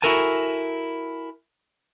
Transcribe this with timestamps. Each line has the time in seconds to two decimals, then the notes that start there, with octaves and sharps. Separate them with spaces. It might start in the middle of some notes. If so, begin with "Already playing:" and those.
0.02 E4 F#4 A4 A#4 G#5 A5